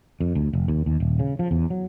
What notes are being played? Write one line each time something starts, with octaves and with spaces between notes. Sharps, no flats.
F2
D2
F1
D#2
D#2
D#1
C#3
F3
E2
F#3